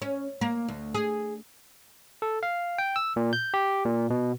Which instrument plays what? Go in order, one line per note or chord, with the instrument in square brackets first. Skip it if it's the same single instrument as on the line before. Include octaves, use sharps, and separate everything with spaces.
[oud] C#4
A#3
D2
G#4
[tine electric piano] A4
F5
G5
E6
A#2
G6
G4
A#2
B2